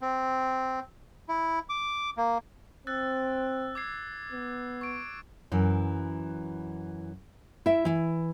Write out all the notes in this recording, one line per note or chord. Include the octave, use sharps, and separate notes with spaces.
C4
E4
D6
A#3
C4 E6 F#6 A6
D6 G#6 C7
B3
C#6 D7
F#2 E3
E4 E5
E3 E4